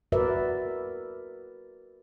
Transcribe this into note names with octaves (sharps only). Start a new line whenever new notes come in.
F#4 A#4 B4 D5 E5